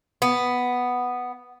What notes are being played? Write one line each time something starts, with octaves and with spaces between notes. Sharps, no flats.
B3